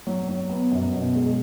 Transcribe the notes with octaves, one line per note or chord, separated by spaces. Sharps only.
F#3
F#3
B3
F#2
B2
G#3